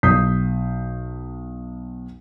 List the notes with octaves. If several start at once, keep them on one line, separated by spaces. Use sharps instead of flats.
B1 D#6 G6 B6 C7